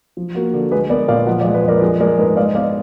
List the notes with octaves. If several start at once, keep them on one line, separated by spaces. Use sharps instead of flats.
F3
A#3 F#4
D3
G#3 G#4 B4
B3 A#4 D5
A#2 D5 F5
F3 D#5 F#5
D5 F5
G#3
B4 D#5
F2 A#4 D5
F3 G#4
G#3 A#4 D5
G#2 B4 D#5
G#3 D5 F5
B3 D5 F5